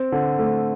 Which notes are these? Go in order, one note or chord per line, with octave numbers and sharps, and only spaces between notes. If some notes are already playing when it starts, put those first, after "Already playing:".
Already playing: C4
D3
A3